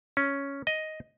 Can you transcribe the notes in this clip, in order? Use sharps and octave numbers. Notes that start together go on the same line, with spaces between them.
C#4
D#5